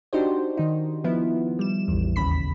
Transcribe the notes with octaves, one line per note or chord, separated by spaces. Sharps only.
D4 D#4 F#4 G4 C5
D#3 D#4
F3 B3 E4
G3 E7
A1 E2
D#2 C#3 B5 B6